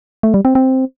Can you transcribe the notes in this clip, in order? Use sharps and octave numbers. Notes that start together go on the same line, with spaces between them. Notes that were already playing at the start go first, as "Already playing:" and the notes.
A3
G3
C4
C4